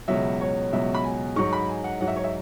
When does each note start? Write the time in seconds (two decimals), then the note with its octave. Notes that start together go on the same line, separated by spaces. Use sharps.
0.08 C#2 B2 F#3 E5
0.41 C#5
0.73 C#2 B2 F#3 E5
0.95 B5
1.04 G#5
1.36 G#2 F#3 C#6
1.53 B5
1.69 G#5
1.84 F#5
2.01 G#2 F#3 F#5
2.08 E5
2.16 C#5
2.24 E5